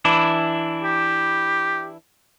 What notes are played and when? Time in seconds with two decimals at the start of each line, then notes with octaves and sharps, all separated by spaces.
0.05 E3 D4 E4
0.84 G4